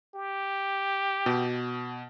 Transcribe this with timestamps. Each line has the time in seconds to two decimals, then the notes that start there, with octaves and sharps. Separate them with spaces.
0.15 G4
1.26 B2